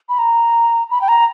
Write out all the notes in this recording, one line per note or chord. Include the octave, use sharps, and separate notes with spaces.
B5
A#5
B5
G5
A#5